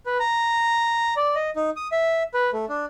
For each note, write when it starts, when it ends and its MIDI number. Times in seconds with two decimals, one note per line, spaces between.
0.06 0.18 71
0.20 1.14 82
1.16 1.35 74
1.35 1.50 75
1.56 1.70 63
1.76 1.88 87
1.92 2.23 76
2.34 2.50 71
2.53 2.65 57
2.69 2.85 62